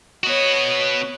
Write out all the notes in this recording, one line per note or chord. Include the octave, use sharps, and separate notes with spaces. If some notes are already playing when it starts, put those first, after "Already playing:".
B3 F#4 C#5 D#5